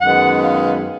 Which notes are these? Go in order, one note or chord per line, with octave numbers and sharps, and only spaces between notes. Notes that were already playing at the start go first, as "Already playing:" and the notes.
F#2 D#3 G#3 B3 F#5
F5